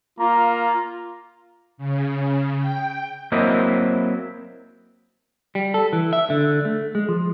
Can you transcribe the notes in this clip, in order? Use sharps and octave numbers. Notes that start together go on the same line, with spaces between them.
A#3 F4 A#5
C#3
G5
F#3 A#3 C4 E4 C5 D#5
G3
A4
E3
E5
D3
A3
G#3
F3